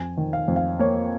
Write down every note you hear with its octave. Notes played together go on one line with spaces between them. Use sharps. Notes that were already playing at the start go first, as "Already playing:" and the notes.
Already playing: F2 G#5
D#3
F5
F2
F5
A#3 C#5